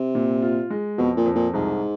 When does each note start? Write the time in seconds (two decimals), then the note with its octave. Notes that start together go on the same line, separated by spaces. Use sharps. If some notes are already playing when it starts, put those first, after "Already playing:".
Already playing: C3
0.15 A#2
0.42 F4
0.70 G#3
0.98 F2 B2
1.17 A#2
1.26 F2
1.35 A#2
1.54 C2 G#2